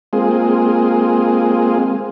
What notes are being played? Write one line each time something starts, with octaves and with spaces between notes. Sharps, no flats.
G#3 A#3 C4 F4 G#4